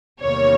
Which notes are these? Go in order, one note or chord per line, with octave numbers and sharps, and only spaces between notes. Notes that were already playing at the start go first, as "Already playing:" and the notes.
E2 C3 D#3 G3 A#3 C#5